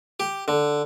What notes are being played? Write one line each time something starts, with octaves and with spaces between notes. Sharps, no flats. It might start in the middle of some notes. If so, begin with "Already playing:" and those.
G4
D3